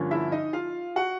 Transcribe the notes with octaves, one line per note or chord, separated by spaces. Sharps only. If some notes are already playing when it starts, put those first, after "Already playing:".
Already playing: G2 D3 F3 A#3 C#4
E4 E5
D#4 D#5
F4 F5
F#4 F#5